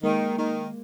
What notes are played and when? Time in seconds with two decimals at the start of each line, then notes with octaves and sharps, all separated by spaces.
0.03 D#3 G#3 A#3
0.38 D#3